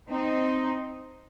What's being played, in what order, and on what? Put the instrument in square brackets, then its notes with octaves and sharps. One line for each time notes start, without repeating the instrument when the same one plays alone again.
[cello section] C4 D#4